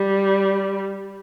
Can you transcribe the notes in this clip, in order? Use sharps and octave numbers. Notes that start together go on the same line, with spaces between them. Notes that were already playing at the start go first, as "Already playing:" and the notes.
Already playing: G3